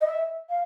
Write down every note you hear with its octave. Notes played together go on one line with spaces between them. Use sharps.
D#5
E5
F5